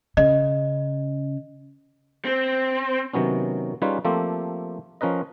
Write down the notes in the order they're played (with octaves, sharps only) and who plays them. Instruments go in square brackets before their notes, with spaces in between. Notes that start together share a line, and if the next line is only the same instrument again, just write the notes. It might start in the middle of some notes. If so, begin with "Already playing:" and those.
[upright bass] C#3 [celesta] D#5
[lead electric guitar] C4
[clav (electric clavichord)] C3 D#3 F#3 B3 C#4
G3 C#4 D#4 F4 G#4 B4
F3 A3 A#3 C4 G4 A4
F3 C#4 A#4 B4 D#5